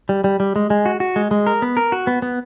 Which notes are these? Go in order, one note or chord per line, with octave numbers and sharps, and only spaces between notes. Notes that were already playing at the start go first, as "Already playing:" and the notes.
G3
G3
G3
G#3
G#3
F#4
F#4
G#3
G#3
A#4
B3
A#4
F#4
B3
B3